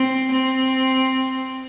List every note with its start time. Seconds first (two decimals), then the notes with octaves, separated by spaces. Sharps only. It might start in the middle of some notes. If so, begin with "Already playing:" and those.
Already playing: C4
0.31 C4